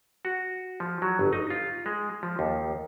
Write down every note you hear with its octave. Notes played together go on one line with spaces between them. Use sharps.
F#4
F3
F#3
G1
D#4
F4
G#3
F3
D#2